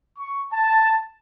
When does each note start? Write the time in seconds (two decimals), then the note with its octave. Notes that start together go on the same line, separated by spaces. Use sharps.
0.19 C#6
0.52 A5